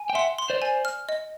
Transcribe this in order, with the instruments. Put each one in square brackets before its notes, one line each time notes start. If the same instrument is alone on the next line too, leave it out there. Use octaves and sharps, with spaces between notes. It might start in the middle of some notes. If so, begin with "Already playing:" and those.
Already playing: [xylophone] G#5
[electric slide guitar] G5
[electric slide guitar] E5 F#5 [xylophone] C6
[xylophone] C6
[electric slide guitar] C5 D5
[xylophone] G#5
F6
D#5